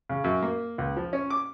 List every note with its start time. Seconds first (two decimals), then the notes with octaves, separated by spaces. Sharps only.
0.09 C#3
0.24 F#2
0.42 A#3
0.78 C#2
0.97 F3
1.13 C#4
1.30 D6